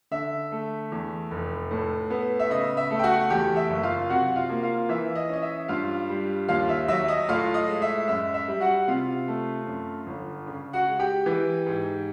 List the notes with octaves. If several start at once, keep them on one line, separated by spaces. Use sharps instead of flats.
D3 E5
A3
E2
F1
A2
B3
E5
C#3 D#5
E5
A3
G5
F#4 F#5
E2 G4 G5
E5
F#1
F4 F5
C3 F#4 F#5
F4 F5
A#3
F4 F5
E3 E5
D#5
C#4 D#5
E5
G2 F4 F5
G3
D#2 F4 F5
E5
F#3 E5
D#5
A2 F4 F5
D#5
G#3
E5
F#2 E5
E5
G3
F#4 F#5
C3 F4 F5
A3
F#2
G1
C#3
F#4 F#5
G#3
G4 G5
E3
G#2